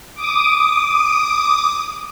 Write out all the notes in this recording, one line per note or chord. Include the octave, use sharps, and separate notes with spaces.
D6 D#6